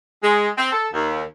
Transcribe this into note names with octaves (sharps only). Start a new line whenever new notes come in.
G#3
C4
A4
D#2